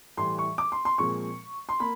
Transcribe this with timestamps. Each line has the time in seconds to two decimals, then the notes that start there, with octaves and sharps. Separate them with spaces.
0.17 A2 E3 G3 C6
0.39 C#6
0.58 D6
0.72 C6
0.85 C6
0.98 A#2 F3 G#3 C4 C#6
1.69 C6
1.80 A#3 B5